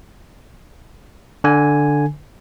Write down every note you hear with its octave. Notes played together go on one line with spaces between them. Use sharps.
D3 G#5